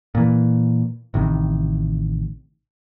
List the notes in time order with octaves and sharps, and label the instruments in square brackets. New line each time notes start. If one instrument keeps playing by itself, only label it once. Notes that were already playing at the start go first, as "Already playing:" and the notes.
[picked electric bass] A#2 E3
A1 C3 D#3